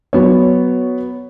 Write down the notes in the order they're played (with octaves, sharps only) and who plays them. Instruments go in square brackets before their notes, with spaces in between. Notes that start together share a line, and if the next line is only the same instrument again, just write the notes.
[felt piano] F#3 B3 C#5